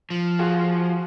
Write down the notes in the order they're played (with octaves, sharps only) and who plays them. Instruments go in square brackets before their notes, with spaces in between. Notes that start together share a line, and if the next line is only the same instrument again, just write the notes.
[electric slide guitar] F3
[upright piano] F4 F#4 G#4